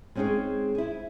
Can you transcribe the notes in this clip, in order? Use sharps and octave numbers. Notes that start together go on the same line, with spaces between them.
G#3 C4 C#4 D#4 G#4 C#5
E4 G#4